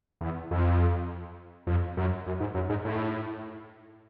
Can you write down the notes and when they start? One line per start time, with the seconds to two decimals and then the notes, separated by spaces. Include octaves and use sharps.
0.21 E2
0.51 F2
1.67 F2
1.97 F#2
2.26 F#2
2.40 G#2
2.54 F#2
2.69 G#2
2.85 A2